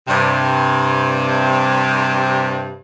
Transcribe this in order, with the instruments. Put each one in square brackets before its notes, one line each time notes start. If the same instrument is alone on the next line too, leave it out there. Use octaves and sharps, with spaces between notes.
[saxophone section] G2 C3